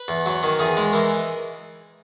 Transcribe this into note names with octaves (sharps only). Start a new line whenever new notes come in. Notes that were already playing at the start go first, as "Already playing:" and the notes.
Already playing: B4
E2
F#3
D#3
E2 G#4
G#3
E3 A#4